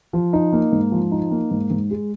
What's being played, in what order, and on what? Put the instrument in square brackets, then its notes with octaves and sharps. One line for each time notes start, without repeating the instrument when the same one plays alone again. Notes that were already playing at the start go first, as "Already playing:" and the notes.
[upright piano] F3
D#4
A#3
G#2
F3
D#4
A#3
G#2
G#2
G#3